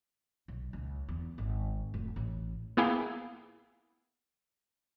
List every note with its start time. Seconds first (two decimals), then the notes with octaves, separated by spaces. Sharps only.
0.48 B1
0.73 C#2
1.08 E2
1.38 G#1
1.94 F1
2.16 A1
2.77 A#3 B3 E4 G#4 F5 G5